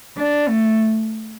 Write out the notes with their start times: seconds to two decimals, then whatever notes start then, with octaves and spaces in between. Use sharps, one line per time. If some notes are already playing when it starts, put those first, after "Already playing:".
0.17 D4
0.48 A3